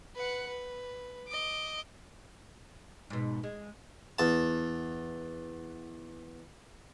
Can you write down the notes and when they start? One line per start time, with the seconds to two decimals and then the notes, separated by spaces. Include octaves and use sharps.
0.15 B4 F#5
0.47 B4
1.28 D#5 D6
3.10 G#2 B2
3.43 G#3
4.19 E2 A5